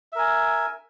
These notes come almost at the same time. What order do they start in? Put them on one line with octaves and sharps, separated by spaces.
E5 A#4 G#5